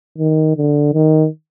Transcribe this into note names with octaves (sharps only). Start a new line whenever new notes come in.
D#3
D3
D#3